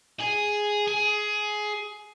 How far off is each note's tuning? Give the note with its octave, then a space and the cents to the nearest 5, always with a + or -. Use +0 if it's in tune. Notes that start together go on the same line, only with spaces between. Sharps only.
G#4 +0
G#4 +15